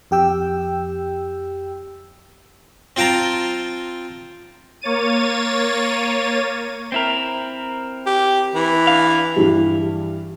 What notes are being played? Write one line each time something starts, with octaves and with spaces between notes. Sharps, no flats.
F2 G4 G5 E6
C4 F4 G5 A5 A#5
A#3 C#5 A6 D#7
C4 E4 A#4
G4
E3
D4 F5
G2 E3 G3